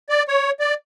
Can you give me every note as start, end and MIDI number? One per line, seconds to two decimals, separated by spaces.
0.09 0.23 74
0.28 0.51 73
0.60 0.74 74